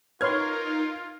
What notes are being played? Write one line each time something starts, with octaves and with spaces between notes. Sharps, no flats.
D#4 F4 A#4 B4 C#5 C6 F6 G#6